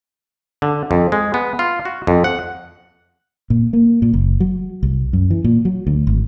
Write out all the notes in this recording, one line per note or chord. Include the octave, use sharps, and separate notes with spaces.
D3
F2
G#3
B3
F4
F#4
F2
F#5
A#2
A#3
A#2
F#1
F#3
C2
F#2
E3
A#2
F#3
D2
G#1